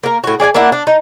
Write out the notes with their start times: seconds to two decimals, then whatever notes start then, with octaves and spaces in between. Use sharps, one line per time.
0.03 A#3 A#4
0.24 A2 F#4
0.40 G#4 D5 F5 G#5
0.54 A#3 D4 E4 F#5
0.72 D4
0.87 D#4